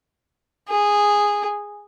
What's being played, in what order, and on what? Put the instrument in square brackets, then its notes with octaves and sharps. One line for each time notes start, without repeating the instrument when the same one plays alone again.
[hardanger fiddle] G#4